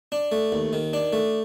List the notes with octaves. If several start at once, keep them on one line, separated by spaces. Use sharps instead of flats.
D4
A3
D#2
D#3
D4
A3